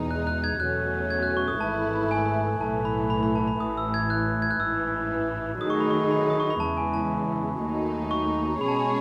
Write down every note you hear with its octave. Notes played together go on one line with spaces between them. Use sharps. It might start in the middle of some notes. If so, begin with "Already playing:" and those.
Already playing: E2 B2 G#3 D#4
F#6
F#6
G#6
E2 B2 F#3 A3 C#4 F#6
G#6
F#6
C#6
D#6
G#1 G#2 E3 A3 E4 A5
G#5
B1 A2 E3 A3 A5
B5
B5
B5
A5
B5
A1 A2 E3 D#6
E6
G#6
F#6
G#6
F#6
A1 G#2 E3 E6
D#3 F#3 A3 D#4 G#4 D#6
C#6
B5
C#6
B5
D#6
C#6
B5
E2 C#3 E3 G#3 A5
G#5
A5
D#2 D#3 F#3 A3 D#4
C#6
B2 G#3 C#4 G#4 C#5 B5
A5
B5